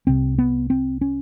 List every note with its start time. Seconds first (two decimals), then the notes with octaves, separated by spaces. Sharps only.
0.07 C2 C3 C4
0.38 B3
0.70 C4
1.01 C#4